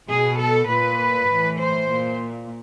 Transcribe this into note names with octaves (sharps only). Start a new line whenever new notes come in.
B2 G#4
A4
A#2 B4
A2 E3
C5
A#2